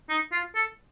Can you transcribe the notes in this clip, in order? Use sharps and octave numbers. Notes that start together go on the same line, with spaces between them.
D#4
F4
A4